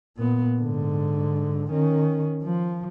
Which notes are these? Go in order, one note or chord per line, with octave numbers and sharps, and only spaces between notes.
A#2 B3
G#2 D3
D#3 C#4
F3